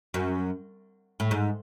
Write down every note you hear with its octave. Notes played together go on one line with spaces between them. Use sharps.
F#2
A2
G#2